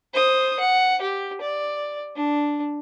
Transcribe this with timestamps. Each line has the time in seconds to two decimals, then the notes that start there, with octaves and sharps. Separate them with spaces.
0.14 C5 D#6
0.59 F#5
1.01 G4
1.41 D5
2.16 D4